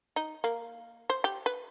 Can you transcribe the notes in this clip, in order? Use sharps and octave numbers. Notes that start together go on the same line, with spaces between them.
D#4
A#3
C5
G4
B4